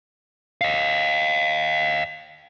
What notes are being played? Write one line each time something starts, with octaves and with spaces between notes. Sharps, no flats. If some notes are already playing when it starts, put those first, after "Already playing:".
D#5 F5